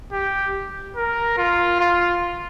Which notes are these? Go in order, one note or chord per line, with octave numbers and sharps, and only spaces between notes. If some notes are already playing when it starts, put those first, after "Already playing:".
G4
A#4
F4
F4